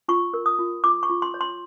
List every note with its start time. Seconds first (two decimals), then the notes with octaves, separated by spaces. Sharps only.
0.08 F4 C#6
0.34 A#4
0.46 D#6
0.59 F4
0.84 F4 D6
1.03 C#6
1.09 F4
1.22 C6
1.34 C#5
1.41 C6